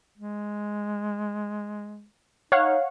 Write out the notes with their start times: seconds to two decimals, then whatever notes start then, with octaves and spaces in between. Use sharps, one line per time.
0.18 G#3
2.52 D#4 C#5 F5 F#5